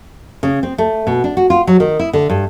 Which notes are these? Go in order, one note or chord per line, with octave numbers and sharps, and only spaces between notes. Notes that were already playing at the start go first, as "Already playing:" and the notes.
C#3
C4
A3
B2
D4
F#4
F4
F#3
D#3
E4
D3
G2